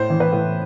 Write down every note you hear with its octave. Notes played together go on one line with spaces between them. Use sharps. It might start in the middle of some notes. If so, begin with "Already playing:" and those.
Already playing: A2 C5
E3
B4
A2